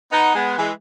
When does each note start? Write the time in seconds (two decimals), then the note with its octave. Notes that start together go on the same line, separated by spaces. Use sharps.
0.12 B3 D#4
0.35 G#3 B3
0.58 E3 G#3